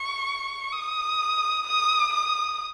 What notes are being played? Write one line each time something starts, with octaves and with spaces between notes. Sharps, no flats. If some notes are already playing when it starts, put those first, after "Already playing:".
Already playing: C#6
D#6
D#6
D#6